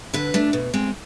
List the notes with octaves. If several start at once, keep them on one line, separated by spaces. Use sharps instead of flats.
D3 B4
A3 D4
B2
G#3 C4